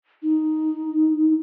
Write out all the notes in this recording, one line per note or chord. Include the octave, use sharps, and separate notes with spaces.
D#4